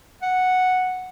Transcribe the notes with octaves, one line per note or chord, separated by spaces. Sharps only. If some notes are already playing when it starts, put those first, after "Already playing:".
F#5